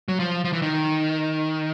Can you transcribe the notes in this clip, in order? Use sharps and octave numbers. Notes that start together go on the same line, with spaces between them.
F#3
F3
F3
E3
D#3